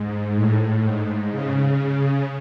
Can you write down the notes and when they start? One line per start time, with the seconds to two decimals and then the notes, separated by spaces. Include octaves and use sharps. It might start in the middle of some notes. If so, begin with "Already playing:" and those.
Already playing: G#2
0.35 A2
0.84 G#2
1.31 C#3